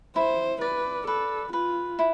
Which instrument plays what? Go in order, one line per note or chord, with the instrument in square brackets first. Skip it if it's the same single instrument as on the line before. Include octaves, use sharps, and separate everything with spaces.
[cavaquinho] E4 [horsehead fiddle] C5
[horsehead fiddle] B4 [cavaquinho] D5
[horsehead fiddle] A4 [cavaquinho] B4
[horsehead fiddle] F4 [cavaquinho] B4
[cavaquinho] E4